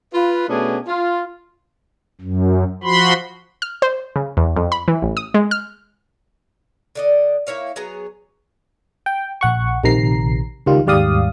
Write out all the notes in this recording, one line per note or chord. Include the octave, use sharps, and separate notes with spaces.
F4 B4
B2 A3 B3 C#4 D4 G#4
F4
F#2
F3 F#4 B5 C6
F6
C5
C#3
E2
F2
B5
E3
A1
D#6
G#3
F6
D3 D5 D#5
A#3 E4 C#5 F5
F#3 B3 G#4 A#5
G5
A#1 F#5 C#6
A#1 C3 D#3 A#5 C7
C#2 D#3 G3 F4
D#2 G#2 G3 D5 F5 D#6